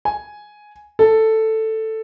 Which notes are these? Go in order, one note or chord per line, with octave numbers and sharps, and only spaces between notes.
G#5
A4